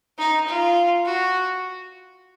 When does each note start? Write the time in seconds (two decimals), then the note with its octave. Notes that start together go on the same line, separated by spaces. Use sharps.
0.18 D#4
0.47 F4
1.06 F#4